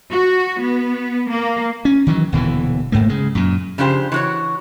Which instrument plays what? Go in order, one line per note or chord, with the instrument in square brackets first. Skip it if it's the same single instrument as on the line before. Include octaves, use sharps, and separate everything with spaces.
[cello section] F#4
B3
A#3
[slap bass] C#4
D#3 E3 F#3
D#1 B2 D3 E3
G#1 G#2 A3 A#3
C#3 G#3
F#2 A#2
[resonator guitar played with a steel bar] C#3 F3 D4 G4 C5
E3 F#4 C#5